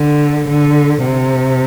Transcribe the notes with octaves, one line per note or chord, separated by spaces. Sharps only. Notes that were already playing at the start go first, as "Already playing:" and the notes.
Already playing: D3
D3
C3